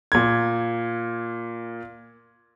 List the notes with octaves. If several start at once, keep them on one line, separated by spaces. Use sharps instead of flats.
A#2 G#6